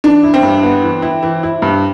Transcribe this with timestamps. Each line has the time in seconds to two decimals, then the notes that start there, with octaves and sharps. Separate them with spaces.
0.04 E3 D4
0.23 E4
0.34 C4
0.43 G2
0.63 B3
0.83 E3
1.02 E4
1.23 E3
1.43 E4
1.62 G2